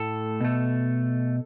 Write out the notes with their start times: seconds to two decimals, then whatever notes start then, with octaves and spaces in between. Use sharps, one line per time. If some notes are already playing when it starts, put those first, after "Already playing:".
Already playing: A2 A3 A4
0.41 B2 A3